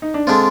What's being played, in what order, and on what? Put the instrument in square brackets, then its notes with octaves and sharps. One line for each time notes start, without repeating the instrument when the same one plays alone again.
[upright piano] D#4
D4
[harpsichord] D3 G#3 D4 F4 [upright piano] C4